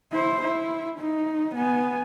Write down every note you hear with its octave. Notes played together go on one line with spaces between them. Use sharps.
E4 C5
E4
D#4
B3 G#5